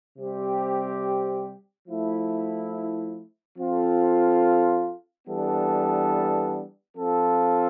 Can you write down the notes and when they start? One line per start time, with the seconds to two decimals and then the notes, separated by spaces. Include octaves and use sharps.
0.18 C3 G3 C4 G4
1.88 F3 A3 E4
3.58 F3 C4 F4 A4
5.27 E3 G3 B3 D4 A4
6.96 F3 C4 F4 A4